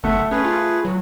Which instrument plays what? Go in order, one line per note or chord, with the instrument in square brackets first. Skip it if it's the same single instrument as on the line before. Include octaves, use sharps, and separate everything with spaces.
[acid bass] F#1 [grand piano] A3 [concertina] E5 F#5
[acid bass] C#4 [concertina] G#4 B4
[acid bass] F4
F#3